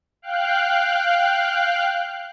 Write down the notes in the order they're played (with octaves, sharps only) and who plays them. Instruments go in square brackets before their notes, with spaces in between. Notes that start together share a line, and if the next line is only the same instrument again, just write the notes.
[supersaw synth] F5 G5 F#6